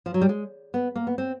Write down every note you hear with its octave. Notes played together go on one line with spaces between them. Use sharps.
F3
F#3
G3
G#3
B3
A#3
B3
C4